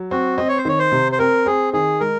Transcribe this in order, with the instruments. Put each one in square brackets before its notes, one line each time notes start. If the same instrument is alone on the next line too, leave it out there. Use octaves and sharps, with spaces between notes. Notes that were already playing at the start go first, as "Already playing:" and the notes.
Already playing: [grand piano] F#3
[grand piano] C4 [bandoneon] F#4
[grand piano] C4 [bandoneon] D#5
[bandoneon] C#5
C5
[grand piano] D#3 [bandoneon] C#5
[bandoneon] C5
[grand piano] C3
[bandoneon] C5
[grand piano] C4 [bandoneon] A#4
[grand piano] C4 [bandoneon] G#4
[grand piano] D#3 [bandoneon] G#4
[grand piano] G#3 [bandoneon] A#4